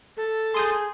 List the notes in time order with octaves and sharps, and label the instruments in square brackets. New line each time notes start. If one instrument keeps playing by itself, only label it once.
[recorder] A4
[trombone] G#4 [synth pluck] C6 D#6 G6